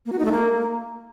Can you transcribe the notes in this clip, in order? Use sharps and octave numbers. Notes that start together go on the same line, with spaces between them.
A#3
F#4
D#4
A3
A#3